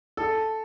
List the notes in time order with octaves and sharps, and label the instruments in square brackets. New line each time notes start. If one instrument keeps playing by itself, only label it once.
[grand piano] A4